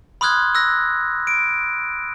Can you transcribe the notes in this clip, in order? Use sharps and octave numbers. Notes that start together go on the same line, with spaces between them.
B5 C6 D#6 F6 F#6 G#6
E6 F#6 A#6
D7